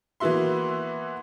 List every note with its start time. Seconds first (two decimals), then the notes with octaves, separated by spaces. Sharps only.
0.20 E3 A#3 B3 F#4 E5 C6